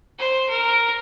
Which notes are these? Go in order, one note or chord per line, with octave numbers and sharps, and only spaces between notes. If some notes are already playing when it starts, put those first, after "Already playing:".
C5
A#4